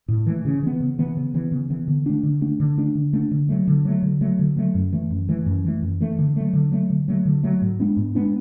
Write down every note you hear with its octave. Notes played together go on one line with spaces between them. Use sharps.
A2
E3 A3
C#3
E3 B3
C#3
E3 B3
C#3
E3 B3
C#3
E3 B3
D3
A3 D4
D3
A3 D4
D3
A3 D4
D3
A3 D4
D3
F#3 A3
D3
F#3 A3
D3
F#3 A3
D3
F#3 A3
F#2
E3 A3
F#2
E3 A3
F#2
E3 A3
F#2
E3 A3
D3
F#3 A3
D3
F#3 A3
D3
F#3 A3
D3
F#3 A3
G#2
G#3 B3 D4
G#2
G#3 B3 D4